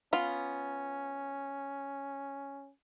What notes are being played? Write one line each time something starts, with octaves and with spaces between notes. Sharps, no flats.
B3 C#4 F4